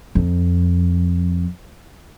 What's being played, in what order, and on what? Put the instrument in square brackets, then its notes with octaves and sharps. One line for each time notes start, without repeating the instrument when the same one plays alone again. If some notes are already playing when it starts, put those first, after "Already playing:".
[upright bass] F2